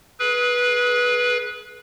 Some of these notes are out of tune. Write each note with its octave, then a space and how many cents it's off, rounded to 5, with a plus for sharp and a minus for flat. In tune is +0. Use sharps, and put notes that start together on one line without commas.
G#4 +25 B4 -15